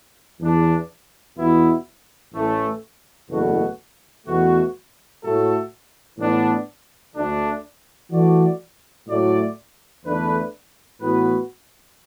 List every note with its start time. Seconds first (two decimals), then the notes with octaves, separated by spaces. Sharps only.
0.40 E2 E3 D4
1.37 E2 B2 B3 E4
2.33 A1 A2 E3 A3
3.29 F#1 E2 B2 A3 F#4
4.26 E2 B2 A3 F#4
5.22 A2 A3 F#4 A4
6.18 A2 E3 B3 D4
7.15 D2 D3 A3 D4
8.11 E3 A3 F#4 D5
9.07 A2 F#3 A3 F#4 D5
10.04 E2 D3 A3 D4 B4
11.00 A2 E3 B3 F#4 B4